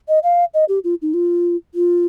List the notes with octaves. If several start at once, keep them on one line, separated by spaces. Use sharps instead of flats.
D#5
F5
D#5
G4
F4
D#4
F4
F4